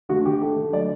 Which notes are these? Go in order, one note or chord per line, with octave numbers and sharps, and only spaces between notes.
D3 F#4
D3 G4
A3
D3
F#3 D5